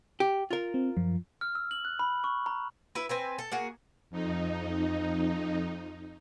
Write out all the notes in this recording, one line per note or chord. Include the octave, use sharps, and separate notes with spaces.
G4
F4 A#4
C4
F#2 F3
F6
E6
F#7
F#6
B5
C#6
A#5
E4 B4
C4 B4 G#5
A4
A#3 F#4 G#4
F2 D#4